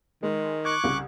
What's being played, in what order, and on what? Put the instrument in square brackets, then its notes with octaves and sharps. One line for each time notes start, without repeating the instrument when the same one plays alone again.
[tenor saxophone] D#3 [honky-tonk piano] G#3
[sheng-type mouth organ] C#6 D6 F#6 [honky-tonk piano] G#6
[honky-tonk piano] C2 C#3